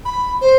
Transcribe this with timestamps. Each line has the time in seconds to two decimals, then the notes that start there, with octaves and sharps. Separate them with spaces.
0.05 B5
0.41 C5